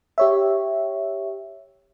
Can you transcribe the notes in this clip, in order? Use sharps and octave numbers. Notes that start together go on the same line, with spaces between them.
G4 C#5 E5